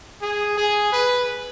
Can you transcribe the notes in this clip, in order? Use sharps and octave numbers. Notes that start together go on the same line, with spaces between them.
G#4
G#4
B4